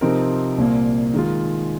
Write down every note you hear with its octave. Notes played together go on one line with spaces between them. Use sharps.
C3 F3 C4 D#4 A#4
C2 A#2 A#3
D#3 G#3 F4